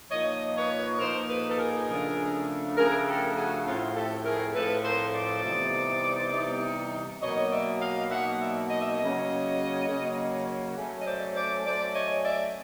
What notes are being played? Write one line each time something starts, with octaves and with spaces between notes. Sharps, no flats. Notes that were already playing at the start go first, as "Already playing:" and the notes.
A#2 F3 A#3 D#4 C#5 D#5
B4 C#5
A#2 F3 A#3 D#4 A#4 C5
A4 B4
A4
G#4 A#4
C#3 F3 A3 D4
C#3 F3 A3 D4 G#4 A#4
G4 A4
F#4 G#4
A2 F3 A3 C4 F4
G4 A4
G#4 A#4
A2 F3 A3 C4 A4 B4
A#4 C5
C5 D5
C3 E3 G3 B3 D#4
C3 E3 G3 B3 D#4
B2 F#3 A#3 D#4 C#5 D#5
D5 E5
D#5 F5
B2 F#3 A#3 D#4 E5 F#5
D5 E5
D#5
E5
C#5 D#5
C#3 F#3 A#3 C#4
C#3 F#3 A#3 C#4
F#3 A3 C#4
D#5
C5 D5
C5 D5
F#3 A3 C#4 C5 D5
C#5 D#5
D5 E5